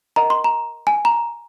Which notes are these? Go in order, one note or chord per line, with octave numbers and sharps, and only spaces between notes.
A#4 D#5 F#5 A#5
C6
A#5
G#5
A#5